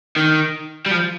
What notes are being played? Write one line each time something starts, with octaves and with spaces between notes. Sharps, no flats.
D#3
G3
F3